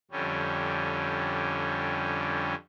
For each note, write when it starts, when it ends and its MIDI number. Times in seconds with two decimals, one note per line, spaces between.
0.11 2.54 41
0.11 2.54 50
0.11 2.54 55
0.11 2.54 61